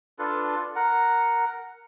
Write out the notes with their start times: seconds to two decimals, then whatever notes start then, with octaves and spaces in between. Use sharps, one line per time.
0.19 D4 F4 A4 B4
0.76 A#4 F#5